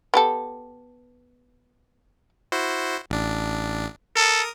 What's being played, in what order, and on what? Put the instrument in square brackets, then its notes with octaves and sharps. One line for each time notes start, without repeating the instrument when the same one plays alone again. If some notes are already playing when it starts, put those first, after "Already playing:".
[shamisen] B3 G4 A4
[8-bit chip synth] E4 F#4 C5
A1 D4
[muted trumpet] A4 [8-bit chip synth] A#4 D#6